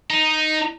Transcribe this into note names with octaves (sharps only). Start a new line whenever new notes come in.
D#4